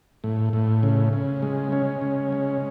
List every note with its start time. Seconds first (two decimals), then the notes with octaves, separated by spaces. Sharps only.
0.24 A2
0.53 A2
0.83 C#3
1.13 C#3
1.42 G#3
1.72 G#3 C#4
2.02 C#3
2.32 G#3